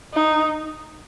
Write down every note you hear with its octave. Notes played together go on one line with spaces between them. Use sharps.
D#4